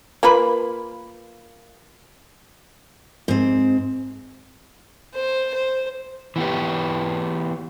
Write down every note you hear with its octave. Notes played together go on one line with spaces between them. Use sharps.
A#3 F4 B4 B5
G#2 C4
C5
C5
E3 B3 G4